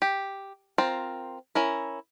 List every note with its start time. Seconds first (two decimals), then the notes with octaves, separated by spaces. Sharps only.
0.02 G4
0.78 C4 F4 A#4 C5
1.55 C#4 E4 A#4